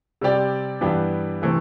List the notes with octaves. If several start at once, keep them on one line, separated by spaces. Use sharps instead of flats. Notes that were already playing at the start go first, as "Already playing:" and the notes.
C3 G3 C4 G4 D5
G2 E3 B3 D4 G4
C3 E3 A3 C4